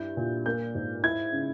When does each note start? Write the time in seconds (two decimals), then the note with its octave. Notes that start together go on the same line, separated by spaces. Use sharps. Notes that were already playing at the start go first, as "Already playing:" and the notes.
Already playing: G2 E4 G6
0.17 A#2
0.46 A#3 G6
0.75 G#2
1.03 E4 G#6
1.33 C#3